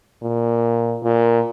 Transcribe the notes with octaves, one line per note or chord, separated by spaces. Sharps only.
A#2
A#2